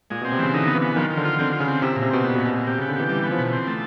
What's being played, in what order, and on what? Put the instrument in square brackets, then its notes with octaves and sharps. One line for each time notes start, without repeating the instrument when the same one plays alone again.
[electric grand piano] A#2 [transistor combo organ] G#3
[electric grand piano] B2
[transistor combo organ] C4
[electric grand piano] C3
[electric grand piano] C#3 [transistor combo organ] E3
[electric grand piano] D3 [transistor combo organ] D#4
[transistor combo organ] B3
[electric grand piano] E3
[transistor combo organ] B3
[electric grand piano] D#3 [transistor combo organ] F3
[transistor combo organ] F3
[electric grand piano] D3
[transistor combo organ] F4
[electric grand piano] D3 [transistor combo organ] C4
[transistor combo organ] F4
[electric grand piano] C#3
[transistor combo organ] C4
[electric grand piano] C3 [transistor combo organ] E4
[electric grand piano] C#3
[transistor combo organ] A#2
[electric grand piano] C3
[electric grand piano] B2 [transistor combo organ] C4
[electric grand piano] A#2 [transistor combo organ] B3
[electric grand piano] B2
[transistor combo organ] A#2
[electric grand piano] B2
[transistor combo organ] A#2
[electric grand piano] C3 [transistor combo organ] G4
[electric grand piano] C#3
[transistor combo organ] B3
[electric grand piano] D3
[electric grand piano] E3 [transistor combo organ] G4
[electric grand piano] E3 [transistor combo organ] G3
[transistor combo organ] B3
[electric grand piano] F3
[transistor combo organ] B2
C4
A3